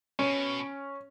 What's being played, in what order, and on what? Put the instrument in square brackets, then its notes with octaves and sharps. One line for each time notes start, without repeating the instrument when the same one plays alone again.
[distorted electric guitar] B2 [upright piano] C#4